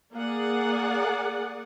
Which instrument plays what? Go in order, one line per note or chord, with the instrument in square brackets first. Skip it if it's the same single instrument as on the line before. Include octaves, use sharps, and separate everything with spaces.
[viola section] A#3 G#4 D5 F#5